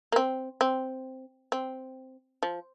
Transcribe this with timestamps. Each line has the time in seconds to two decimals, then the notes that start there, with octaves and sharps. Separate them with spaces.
0.12 A#3
0.16 C4
0.61 C4
1.52 C4
2.43 F3